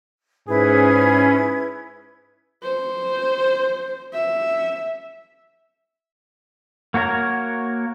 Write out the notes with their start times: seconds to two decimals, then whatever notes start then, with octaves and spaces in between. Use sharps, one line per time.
0.48 G#2 C#4 E4 G#4 B4 G#6
2.63 C5
4.13 E5
6.94 A#3 F#4 A#4 C#5 A#5